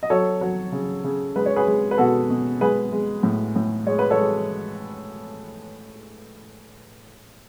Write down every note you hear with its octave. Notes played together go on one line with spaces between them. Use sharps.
D#5
F#3 A4 C#5
F#3
C#3
C#3
G#3 B4
C#5
G#4 B4
G#3
B4
B2 F#4 A4
B2
G#3 G#4 B4
G#3
A2
A2
G#3 C#5
B4
A4 C#5
G#3